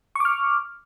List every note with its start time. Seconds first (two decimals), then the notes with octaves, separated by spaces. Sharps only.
0.16 C#6
0.20 D6
0.25 F6